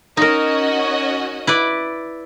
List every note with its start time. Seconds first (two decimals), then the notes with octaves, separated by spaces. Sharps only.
0.17 C#4 D#4 F#4 A#4 D#5
1.47 E4 B4 D5